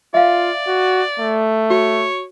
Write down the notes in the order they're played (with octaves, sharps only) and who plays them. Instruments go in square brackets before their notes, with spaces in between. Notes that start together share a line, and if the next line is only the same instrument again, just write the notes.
[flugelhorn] F4 [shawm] D5 [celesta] E5 F5
[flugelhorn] F#4
A3
[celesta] F#4 [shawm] C#5